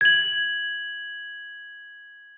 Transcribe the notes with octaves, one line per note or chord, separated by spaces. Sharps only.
G#6 F#7